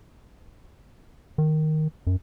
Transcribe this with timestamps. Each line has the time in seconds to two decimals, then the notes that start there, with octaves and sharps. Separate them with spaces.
1.38 D#3
2.07 F#2